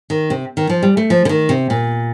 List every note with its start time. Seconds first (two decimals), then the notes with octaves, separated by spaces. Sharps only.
0.10 D#3
0.30 C3
0.57 D#3
0.70 F3
0.83 G3
0.97 A3
1.10 F3
1.25 D3
1.29 D#3
1.49 C3
1.70 A#2